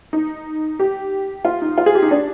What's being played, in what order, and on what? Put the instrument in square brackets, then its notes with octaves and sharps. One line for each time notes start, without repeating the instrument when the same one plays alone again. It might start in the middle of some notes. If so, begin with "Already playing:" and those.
[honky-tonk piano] D#4
G4
F4
D#4
F4
G#4
G4
D#4
D4